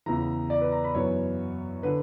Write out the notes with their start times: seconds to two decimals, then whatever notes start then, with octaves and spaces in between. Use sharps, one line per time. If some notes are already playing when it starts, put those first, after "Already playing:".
0.06 E2 C#3 E3 A#5
0.50 D5
0.61 B4
0.72 A#5
0.84 B5
0.95 F#2 E3 B3 C#5
1.83 D3 B4